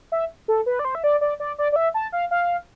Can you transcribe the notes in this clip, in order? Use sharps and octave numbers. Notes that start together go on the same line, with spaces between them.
E5
A4
B4
D5
C5
E5
D5
D5
D5
D5
D5
E5
A5
F5
F5